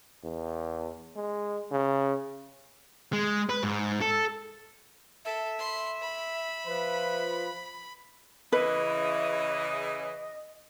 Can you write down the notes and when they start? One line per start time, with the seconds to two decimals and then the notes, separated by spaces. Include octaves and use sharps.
0.24 E2
1.16 G#3
1.71 C#3
3.13 G#3
3.49 B4
3.63 G#2
4.01 A4
5.25 A4 E5
5.59 B5 C6
6.02 B5
6.66 F3 B4
8.53 C#3 E3 B4 D#5